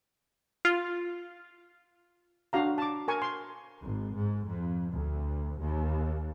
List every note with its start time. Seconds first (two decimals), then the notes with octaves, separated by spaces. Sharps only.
0.65 F4
2.53 D4 F#4 F5 A#5
2.78 A5 D6
3.08 A#4 G#5 C#6
3.22 C6
3.80 G#1
4.16 G#2
4.48 F2
4.91 D2
5.59 D#2